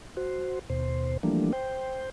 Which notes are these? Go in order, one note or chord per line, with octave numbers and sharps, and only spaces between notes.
F#4 C5
D#2 B2 C5
E3 F3 G3 A3 A#3 D4
C5 G5